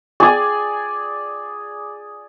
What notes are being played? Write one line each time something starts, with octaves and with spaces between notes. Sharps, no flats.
G#4 D5 G#5 D6